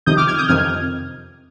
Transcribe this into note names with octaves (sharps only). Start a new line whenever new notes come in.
F2 C3 D#3 D#6 G6
D6 F6
F6 G#6
D#6 G6
F2 C3 D#3 F6 G#6